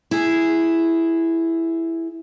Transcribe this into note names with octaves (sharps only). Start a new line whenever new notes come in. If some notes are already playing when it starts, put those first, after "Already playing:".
E4 G#4